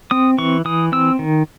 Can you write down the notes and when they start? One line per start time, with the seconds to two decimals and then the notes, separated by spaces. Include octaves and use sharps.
0.11 C4 D#6
0.38 E3 C#6
0.65 E3 D#6
0.92 C4 E6
1.19 D#3